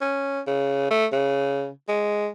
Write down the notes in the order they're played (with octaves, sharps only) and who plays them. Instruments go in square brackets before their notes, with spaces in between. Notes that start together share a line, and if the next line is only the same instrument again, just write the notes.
[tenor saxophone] C#4
C#3
A3
C#3
G#3